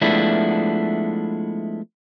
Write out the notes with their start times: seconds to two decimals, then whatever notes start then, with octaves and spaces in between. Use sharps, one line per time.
0.01 F3 G#3 A3 B3 D4 E4